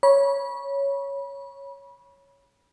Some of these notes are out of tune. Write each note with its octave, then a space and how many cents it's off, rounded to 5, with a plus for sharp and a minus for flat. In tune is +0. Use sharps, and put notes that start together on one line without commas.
C#5 +0 B5 -30